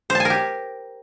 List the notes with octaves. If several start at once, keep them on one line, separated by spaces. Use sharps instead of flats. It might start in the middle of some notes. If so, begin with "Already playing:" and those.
C5
A5
G#5
A#4
G4